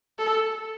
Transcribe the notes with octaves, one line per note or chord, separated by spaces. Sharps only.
A4